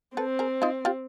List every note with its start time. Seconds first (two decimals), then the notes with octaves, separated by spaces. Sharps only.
0.16 C4 A4 B4
0.39 G#4 A#4
0.62 D#4 F4
0.85 F4 G4